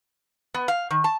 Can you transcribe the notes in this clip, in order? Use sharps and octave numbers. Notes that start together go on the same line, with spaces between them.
B3
F5
D#3
A5